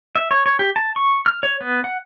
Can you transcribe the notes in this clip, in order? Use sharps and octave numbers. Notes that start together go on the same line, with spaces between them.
E5
C#5
C#5
G4
A5
C#6
F6
C#5
B3
F#5